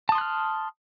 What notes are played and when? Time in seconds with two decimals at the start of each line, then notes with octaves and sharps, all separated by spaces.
0.09 A5
0.12 D#6
0.15 C6
0.18 F#6
0.21 F6